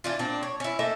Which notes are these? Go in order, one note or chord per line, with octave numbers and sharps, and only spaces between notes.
E3 D4 F4
A#2 C4 D4
C#5
C#4 E4
A3 A#3 D#4 E5